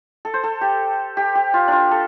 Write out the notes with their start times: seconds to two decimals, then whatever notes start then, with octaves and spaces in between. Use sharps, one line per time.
0.25 A4
0.34 C5
0.44 A4
0.61 G4
1.17 G4
1.35 G4
1.54 F4
1.68 D4 F4
1.91 A4